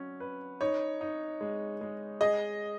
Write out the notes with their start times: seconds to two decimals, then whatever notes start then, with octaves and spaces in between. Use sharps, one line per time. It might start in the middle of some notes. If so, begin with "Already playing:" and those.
Already playing: F#3 C#4
0.20 B4
0.61 D#4 C#5
1.01 D#4
1.41 G#3
1.81 G#3
2.21 G#4 D#5